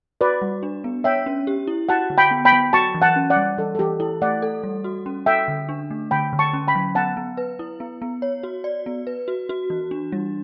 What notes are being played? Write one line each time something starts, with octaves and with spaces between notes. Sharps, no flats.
F#4 B4 D5
G3
D4
B3
C#5 E5 G5
C#4
G4
E4
F#4 F#5 A5
D3
G5 B5
B3
G5 B5
F#3
F#4 A5 C#6
E3
F#5 A5
C#4
D5 F#5
G3
E3 A4
A4
E3 G4
E4 A4
A3 D5 F#5
A4
G3
F#4
C#4
A4 E5 G5
D3
D4
A3
D3 G5 B5
D3
A5 C#6
C#4
G5 B5
F#3
B3 F#5 A5
B3
B4
E4
B3
B3
C#5
F#4
D5
B3
B4
F#4
F#4
E3
D4
G3